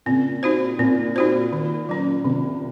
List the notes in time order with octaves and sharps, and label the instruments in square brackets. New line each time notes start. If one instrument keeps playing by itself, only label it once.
[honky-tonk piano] A#2 C#3 [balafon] C4
[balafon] D#4 F#4 C5
[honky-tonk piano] A#2 [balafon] C4
[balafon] D#4 F#4 C5
D#3
F#3 C#4
[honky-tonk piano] C3 [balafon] D#3